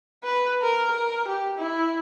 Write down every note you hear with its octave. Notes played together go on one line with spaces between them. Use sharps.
B4
A#4
A#4
G4
E4